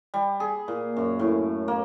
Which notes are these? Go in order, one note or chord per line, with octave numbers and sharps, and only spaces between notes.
G3
G#4
A#2
F#2
A2
A#3